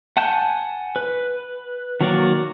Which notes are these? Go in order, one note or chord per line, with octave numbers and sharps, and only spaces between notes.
F#5 G#5 A5 G6
B4
D#3 F#3 A#3 F#4 D5